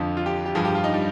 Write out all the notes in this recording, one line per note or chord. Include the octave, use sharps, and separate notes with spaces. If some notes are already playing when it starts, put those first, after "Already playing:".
Already playing: F2 D3 F3
F4
G4
G4
G2 F3 G#4
G4
F4
D#4
G3